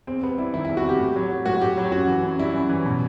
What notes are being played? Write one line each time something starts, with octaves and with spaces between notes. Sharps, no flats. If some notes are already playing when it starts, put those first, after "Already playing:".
E2 C4
C3 B3
G3 E4
D#3 E4
E4
E2
F#4
C3 G4
A2
F#3
F#3
A2 F#4
A2 G4
F#3
F#2 F#4
E3
F#2
G3 E4
F#2
E3
B2